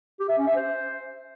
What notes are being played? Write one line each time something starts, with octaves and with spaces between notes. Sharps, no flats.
G4
E5
C#4
E5
C5